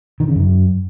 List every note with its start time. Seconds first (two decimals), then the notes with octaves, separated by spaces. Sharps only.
0.20 D#3
0.28 C#3
0.35 F#2